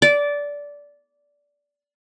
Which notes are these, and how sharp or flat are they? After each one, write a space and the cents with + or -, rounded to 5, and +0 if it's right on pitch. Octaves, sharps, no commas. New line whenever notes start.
D5 -15